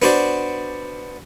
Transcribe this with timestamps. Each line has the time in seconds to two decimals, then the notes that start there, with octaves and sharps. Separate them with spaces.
0.02 B3 D4 F#4 C5 D5